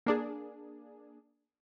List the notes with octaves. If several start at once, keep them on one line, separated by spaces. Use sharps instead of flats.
A#3 D4 G#4